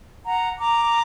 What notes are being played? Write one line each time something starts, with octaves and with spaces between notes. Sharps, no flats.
F#5 A#5
A#5 D6